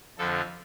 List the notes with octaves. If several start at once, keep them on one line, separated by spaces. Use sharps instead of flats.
F2 D3 F3 A4